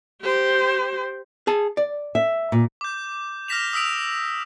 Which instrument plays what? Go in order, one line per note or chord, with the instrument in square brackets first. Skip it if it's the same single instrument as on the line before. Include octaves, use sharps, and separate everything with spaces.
[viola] G4 C5
[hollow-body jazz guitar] G#4 A5
D5
[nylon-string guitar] E5
A#2
[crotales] D6 G6
F6 G6 A#6 B6 E7 F7
D#6 E6 B6 D7 F7